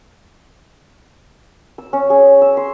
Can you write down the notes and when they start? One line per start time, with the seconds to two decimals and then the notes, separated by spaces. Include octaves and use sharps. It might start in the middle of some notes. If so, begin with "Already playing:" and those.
1.78 E6
1.93 C#4
2.10 G#4
2.41 E6
2.57 C6